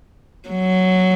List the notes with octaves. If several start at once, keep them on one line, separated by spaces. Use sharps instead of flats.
F#3